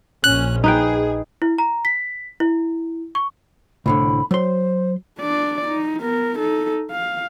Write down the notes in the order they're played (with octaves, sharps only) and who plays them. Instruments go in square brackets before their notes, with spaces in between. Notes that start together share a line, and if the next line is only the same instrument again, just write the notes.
[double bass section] A#1 [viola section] C#4 [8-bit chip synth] F#6
[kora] D#4 B4 G5 [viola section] G#4
[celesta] E4
A#5
B6
E4
C#6
[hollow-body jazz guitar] C2 A2 D3 [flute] B5
[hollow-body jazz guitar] F#3 C6 [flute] C5
[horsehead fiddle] D4 D5
D#4
B3 A#4
D#4 A4
F5